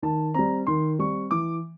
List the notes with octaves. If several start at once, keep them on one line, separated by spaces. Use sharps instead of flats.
D#3 A5
G3 C4 A#5
D#3 C6
G3 C4 C#6
E3 D6